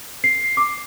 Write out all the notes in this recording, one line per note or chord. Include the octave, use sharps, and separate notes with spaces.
C7
D6